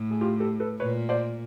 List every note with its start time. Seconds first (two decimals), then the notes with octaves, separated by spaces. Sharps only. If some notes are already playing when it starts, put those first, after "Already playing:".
Already playing: A2
0.11 G#4
0.21 F4 G4
0.40 G4 A4
0.60 A4 B4
0.79 A#2 B4 C#5
1.09 C5 D5